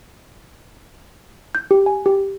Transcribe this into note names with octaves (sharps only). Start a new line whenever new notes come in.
G6
G4
G#5
G4